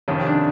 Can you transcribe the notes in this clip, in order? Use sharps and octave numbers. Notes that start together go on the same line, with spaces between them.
F2 C3 D#3 C#4
D4